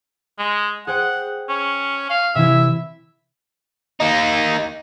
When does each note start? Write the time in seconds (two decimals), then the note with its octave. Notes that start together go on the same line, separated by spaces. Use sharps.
0.38 G#3
0.87 G#4 C5 F#5 G5
1.49 C#4
2.10 F5
2.35 C3 E3 E4 E5
4.00 A#3 D#4